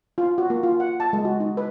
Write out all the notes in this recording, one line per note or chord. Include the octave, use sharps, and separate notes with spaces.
F4
F#4
A#3
F4
F#5
A5
G#3
F#4
D#4
B4